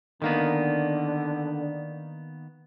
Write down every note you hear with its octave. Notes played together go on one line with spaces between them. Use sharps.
D3 D#3 A#3 B3